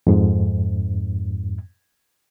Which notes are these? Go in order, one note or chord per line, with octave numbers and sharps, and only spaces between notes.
F2 G#2